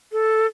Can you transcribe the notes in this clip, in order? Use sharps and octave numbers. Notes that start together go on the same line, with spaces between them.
A4